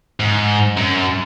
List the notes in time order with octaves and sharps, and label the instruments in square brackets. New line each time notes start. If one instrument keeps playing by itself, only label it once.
[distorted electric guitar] G#2
F#2